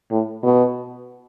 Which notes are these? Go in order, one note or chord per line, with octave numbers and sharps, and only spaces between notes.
A2
B2